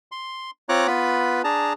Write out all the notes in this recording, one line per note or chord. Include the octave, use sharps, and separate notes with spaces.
C6
C4 F4 C#5 A#5 D6 F#6
B3 F4 B4 B5
D4 G#4 A5 A#5